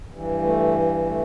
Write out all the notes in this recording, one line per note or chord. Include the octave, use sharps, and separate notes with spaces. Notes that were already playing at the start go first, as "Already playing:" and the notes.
G2 E3
A3
A3